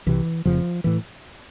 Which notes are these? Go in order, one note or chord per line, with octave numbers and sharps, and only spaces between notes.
C2 C3 E3
F1 F2 C#3 F3
A2 E3